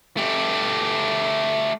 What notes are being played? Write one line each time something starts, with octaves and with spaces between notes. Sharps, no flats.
A3 G4